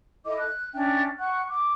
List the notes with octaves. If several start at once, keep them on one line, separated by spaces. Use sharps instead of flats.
E4 A4 D#5 D6
F#6
C#4 D4 E5 G5
F#5 C#6 F#6
D6